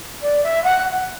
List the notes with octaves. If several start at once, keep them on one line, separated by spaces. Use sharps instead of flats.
D5
E5
F#5